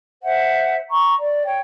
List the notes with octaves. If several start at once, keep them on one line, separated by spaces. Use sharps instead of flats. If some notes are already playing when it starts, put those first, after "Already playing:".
C5 E5 F#5
A#5 C#6
D5
C#5 G5